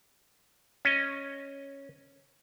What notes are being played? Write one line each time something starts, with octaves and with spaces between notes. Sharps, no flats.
C#4 D#5